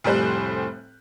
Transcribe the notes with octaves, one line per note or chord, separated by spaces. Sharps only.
F1 A2 G3 C5 G#5 F#6